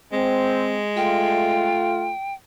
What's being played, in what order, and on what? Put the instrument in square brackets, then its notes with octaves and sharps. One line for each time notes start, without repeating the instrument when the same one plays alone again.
[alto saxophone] G#3 [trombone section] C4
[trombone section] A3 F4 [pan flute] G5